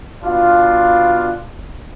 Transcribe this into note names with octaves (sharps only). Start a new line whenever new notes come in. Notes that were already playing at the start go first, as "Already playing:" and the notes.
B2 D4 F4